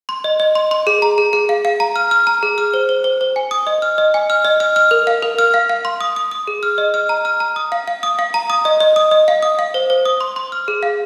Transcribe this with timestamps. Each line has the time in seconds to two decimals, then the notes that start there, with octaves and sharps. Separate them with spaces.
0.09 C6
0.24 D#5
0.40 D#5
0.55 C6
0.71 C6
0.87 G#4
1.02 A#5
1.18 G#4
1.33 G#4
1.49 F5
1.65 F5
1.80 A#5
1.96 F6
2.11 F6
2.27 A#5
2.43 G#4
2.58 F6
2.74 C5
2.89 C5
3.04 C5
3.21 C5
3.36 G#5
3.51 D#6
3.67 D#5
3.82 F6
3.98 D#5
4.14 G#5
4.30 F6
4.45 D#5
4.60 F6
4.76 F6
4.91 A#4
5.07 F5
5.23 A#4
5.39 F6
5.54 F5
5.69 F5
5.85 C6
6.01 D#6
6.16 D#6
6.31 D#6
6.47 G#4
6.63 F6
6.78 D#5
6.94 F6
7.09 A#5
7.25 F6
7.40 A#5
7.56 D#6
7.72 F5
7.88 F5
8.03 D#6
8.19 F5
8.34 A#5
8.50 D#6
8.65 D#5
8.80 D#5
8.96 D#6
9.11 D#5
9.28 F5
9.43 D#6
9.59 F5
9.74 C5
9.90 C5
10.05 D#6
10.21 C6
10.36 C6
10.52 F6
10.68 G#4
10.83 F5